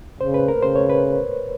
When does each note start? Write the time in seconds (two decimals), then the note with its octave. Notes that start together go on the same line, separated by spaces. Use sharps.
0.20 C#3 C5
0.34 B4
0.48 A#4
0.62 C#3 C5
0.76 C#5
0.89 B4